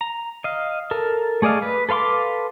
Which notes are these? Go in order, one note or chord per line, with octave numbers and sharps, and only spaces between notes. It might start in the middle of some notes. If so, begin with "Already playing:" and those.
A#5
D#5 F5
A4 A#4
A3 G#4 D5 D#5 F5
B4
A4 B4 F5 C6 D6